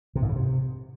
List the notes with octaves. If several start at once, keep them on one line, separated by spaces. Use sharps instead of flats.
C3
G#2
C#3
C3